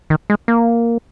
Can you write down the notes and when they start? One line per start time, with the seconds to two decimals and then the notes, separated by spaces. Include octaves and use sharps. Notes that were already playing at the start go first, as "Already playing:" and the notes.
0.10 D#3
0.30 G#3
0.48 A#3